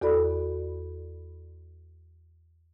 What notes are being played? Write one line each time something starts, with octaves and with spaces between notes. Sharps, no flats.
E2 F#4 A4 D5 B5